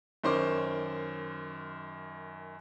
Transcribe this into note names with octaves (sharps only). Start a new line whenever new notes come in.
F#2 D#3 C5 C#5 C6 D6